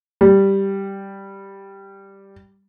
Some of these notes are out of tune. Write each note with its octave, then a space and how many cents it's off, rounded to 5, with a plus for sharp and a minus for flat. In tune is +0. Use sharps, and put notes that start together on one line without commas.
G3 +0